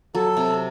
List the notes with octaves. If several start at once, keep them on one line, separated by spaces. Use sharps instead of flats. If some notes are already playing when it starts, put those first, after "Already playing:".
F#3 A4
C3